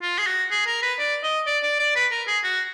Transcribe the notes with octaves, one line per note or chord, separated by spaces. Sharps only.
F4
G#4
F#4
G#4
A#4
B4
D5
D#5
D5
D5
D5
B4
A#4
G#4
F#4